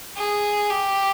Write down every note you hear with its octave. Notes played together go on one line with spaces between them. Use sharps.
G#4
G4